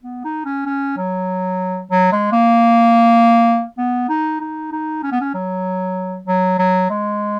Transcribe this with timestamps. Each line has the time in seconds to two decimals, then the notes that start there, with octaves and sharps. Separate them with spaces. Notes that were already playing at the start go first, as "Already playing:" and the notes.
0.04 B3
0.24 D#4
0.45 C#4
0.66 C#4
0.97 F#3
1.91 F#3
2.12 G#3
2.32 A#3
3.78 B3
4.09 D#4
4.41 D#4
4.72 D#4
5.03 C#4
5.12 B3
5.21 C#4
5.34 F#3
6.27 F#3
6.59 F#3
6.90 G#3